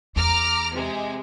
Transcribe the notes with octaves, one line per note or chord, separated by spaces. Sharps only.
E2 A#5 D6 F6
C3 G#3